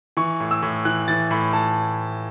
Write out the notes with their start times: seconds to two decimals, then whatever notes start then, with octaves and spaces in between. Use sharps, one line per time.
0.17 E3 C#6
0.40 A2
0.51 E6
0.63 A2
0.85 E3 F#6
1.08 E3 A6
1.31 A2 B5
1.53 A2 A5